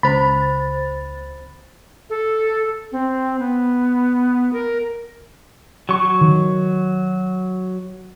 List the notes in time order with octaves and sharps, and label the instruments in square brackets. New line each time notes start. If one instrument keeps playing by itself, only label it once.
[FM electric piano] C#2 [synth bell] C5 A6 [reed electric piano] B5
[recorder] A4
C4
B3
A#4
[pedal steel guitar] F#3 C#6
[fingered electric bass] D#3